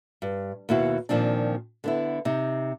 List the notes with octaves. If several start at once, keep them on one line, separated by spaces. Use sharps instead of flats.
G2
D#2 B2 E4 F#4
A#2 D#3 F3 C4 D4
D3 B3 E4
C3 D#4